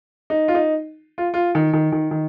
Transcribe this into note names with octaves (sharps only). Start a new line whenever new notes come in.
D#4
F4
D#4
F4
F4
D#3
D#3
D#3
D#3